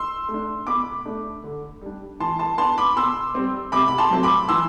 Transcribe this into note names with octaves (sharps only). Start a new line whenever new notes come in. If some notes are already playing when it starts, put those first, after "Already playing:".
Already playing: C6 E6
A3
D4
B2 B5 D6
A3 D4
D3
G3 D4
E3 A5 C6
A5 C6
B3 D4 A5 C6
B5 D6
B2 C6 E6
G3 C4
C3 B5 D6
B5
A5 C6
F#3 A3 C4
B5 D6
E3 C6 E6